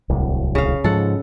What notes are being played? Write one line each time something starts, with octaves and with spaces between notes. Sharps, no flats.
D1 C2
C#3 F5
G#2 F3 A4 F#5